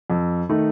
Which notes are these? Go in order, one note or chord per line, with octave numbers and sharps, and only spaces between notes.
F2
D#3 A3 D#4